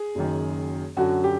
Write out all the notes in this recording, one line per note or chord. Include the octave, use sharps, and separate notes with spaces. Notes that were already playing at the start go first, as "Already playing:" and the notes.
Already playing: G#4
F#1 F#2 D#3
F#2 D3 F#3 F#4
G4